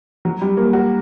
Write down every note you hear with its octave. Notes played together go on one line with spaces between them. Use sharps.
F#3
G3
A#3
F#4